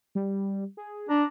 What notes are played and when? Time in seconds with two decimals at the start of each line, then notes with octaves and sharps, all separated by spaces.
0.15 G3
0.77 G#4
1.09 D4 A#5